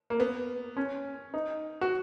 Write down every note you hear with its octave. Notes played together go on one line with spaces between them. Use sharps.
A#3
B3
C#4
D#4
F#4